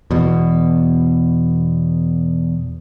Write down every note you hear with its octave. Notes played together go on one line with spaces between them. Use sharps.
E2 B2